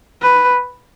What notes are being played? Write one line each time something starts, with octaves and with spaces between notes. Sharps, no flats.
B4